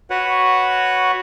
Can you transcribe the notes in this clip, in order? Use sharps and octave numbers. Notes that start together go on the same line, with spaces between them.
F#4 B4 C#5 F#5